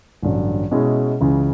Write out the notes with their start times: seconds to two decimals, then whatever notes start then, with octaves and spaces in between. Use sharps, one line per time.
0.22 A1 G2 D3 F#3
0.72 B2 G#3 C#4 E4 G#4
1.21 C#2 C#3 E3